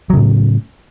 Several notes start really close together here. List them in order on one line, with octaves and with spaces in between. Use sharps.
F#3 C#3 A2